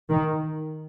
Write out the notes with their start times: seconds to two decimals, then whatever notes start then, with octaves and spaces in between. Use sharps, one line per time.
0.10 D#3